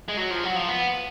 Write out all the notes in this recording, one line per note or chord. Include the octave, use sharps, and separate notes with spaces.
G#3
F#3
F3
F#3
F3
B3